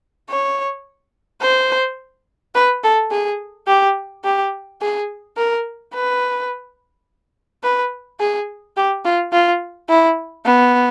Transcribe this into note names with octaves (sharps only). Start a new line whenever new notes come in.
C#5
C5
B4
A4
G#4
G4
G4
G#4
A#4
B4
B4
G#4
G4
F4
F4
E4
B3